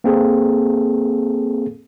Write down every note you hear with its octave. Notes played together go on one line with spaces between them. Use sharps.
A#3 C4 G#4 A4